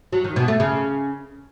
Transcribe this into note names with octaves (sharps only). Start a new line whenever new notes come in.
F#3
D#3
B2
A3
C#3